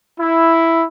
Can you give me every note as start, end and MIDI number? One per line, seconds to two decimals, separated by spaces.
0.19 0.84 64